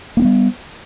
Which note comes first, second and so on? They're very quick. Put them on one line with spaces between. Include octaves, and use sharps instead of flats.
A#3 D4 B3 G3